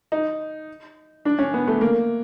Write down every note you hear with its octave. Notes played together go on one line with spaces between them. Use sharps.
D#4
D4
C#4
B3
A3
A#3